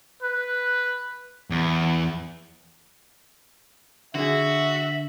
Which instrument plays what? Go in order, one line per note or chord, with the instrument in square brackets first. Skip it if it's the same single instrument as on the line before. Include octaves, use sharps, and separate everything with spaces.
[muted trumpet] B4
[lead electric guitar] E2
[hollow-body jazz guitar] D3 G#4 [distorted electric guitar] F#4 [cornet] E5